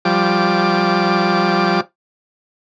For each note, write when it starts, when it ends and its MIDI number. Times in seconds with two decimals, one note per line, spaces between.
0.05 1.81 53
0.05 1.81 55
0.05 1.81 86